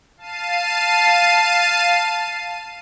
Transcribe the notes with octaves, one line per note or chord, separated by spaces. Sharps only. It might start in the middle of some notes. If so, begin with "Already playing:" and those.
F5 A5 C7 D#7